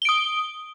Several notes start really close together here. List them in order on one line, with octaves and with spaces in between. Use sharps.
G7 D7 D#6